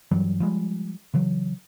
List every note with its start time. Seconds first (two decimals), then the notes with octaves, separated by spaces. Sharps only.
0.11 G2 E3 F#3 G3
0.40 F3 G3 G#3
1.14 C#3 E3 F#3